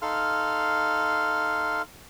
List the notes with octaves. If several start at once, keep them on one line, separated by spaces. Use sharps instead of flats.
D#4 A4 F5 C6 F6